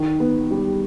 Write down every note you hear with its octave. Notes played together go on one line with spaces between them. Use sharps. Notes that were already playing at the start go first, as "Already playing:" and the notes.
Already playing: D#3
B3
G3